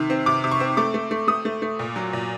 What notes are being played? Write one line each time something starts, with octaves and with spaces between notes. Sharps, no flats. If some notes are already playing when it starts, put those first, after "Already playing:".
Already playing: C3 D#3
C4
C3 D6
C3
C#6
C4
A3 D6
A3
A3
A3 D#6
A3
A3
A#2
F#3
A#2